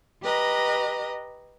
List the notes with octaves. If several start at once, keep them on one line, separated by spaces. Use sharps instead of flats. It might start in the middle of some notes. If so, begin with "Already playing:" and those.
G4 B4 D#5 A#5